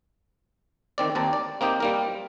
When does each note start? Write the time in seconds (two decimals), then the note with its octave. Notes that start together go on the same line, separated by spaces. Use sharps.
0.98 D#3 C4 D5
1.15 D#2 C4 A5 A#5
1.33 D5
1.61 A#3 C4 D#4 G4
1.80 G3 A#3 A#4